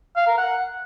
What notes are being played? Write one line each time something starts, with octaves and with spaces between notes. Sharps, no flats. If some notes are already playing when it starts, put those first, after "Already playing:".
F5
A#4
F#5